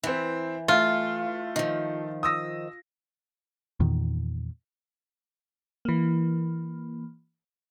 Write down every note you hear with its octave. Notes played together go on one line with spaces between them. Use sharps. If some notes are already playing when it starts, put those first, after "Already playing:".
E3 C4 E4
A3 F4
D#3 F3
D#6 E6 A#6
E2 A#2 D#3
E3 A#3